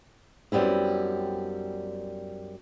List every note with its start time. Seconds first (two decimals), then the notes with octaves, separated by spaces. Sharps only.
0.52 F#2 G3 B3 C4 E4